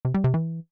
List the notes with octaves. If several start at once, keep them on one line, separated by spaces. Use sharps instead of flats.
C3
G3
C3
E3